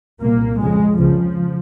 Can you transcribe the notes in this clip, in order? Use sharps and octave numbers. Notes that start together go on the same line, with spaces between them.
C2 A#2 A#3
F2 C#3 G#3
C#2 C#3 F3